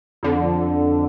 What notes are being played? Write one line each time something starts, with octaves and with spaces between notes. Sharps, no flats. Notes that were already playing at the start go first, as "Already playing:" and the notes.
F2 D3